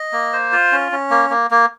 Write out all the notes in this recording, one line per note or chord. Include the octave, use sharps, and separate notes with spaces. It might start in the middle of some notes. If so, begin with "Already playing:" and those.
Already playing: D#5
A#3
C5
F4
C#4
C#4
A#3
A#3
A#3